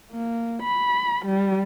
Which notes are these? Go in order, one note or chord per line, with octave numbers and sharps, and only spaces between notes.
A#3
B5
G3